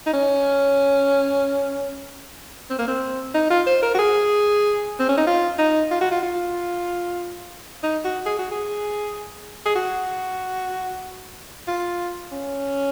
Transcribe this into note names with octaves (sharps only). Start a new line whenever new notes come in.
D#4
C#4
C4
A#3
C4
D#4
F4
C5
A#4
F#4
G#4
C4
C#4
D#4
F4
D#4
F4
F#4
F4
F4
D#4
F#4
G#4
F#4
G#4
G#4
F#4
F4
C#4